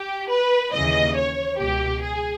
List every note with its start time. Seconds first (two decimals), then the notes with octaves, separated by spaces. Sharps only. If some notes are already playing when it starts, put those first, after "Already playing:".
Already playing: G4
0.30 B4
0.73 D#2 C#3 E3 D#5
1.16 C#5
1.59 C#2 B2 G4
2.03 G#4